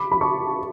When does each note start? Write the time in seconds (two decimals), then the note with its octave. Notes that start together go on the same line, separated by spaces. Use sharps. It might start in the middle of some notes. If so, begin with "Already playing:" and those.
Already playing: B5 D6
0.11 B5
0.21 A5 C#6